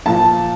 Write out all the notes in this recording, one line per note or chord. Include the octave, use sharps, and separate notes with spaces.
A#2 F3 A5